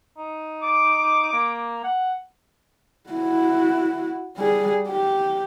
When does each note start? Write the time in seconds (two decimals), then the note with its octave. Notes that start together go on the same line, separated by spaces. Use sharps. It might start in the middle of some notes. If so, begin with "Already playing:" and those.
0.18 D#4
0.62 D6
1.33 A#3
1.84 F#5
3.10 E4 F#4
4.37 G3 G#4
4.88 G4